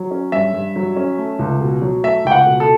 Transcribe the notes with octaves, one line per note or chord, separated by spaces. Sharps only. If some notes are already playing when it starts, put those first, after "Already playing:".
Already playing: F#3
C#4
G2 E5
G2
F#3
C#4
A3
C#2
B2
F#3
A3 E5
C#2 G5
F#5
B2
A4